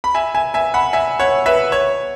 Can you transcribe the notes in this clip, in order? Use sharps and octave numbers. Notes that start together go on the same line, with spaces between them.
B5
E5 G#5
E5 G#5
E5 G#5
F#5 B5
E5 G#5
C#5 F#5
B4 E5
C#5